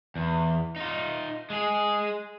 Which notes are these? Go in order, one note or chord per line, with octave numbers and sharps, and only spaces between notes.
E2
D#4 F4
G#3 G#4